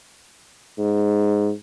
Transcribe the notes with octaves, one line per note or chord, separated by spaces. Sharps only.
G#2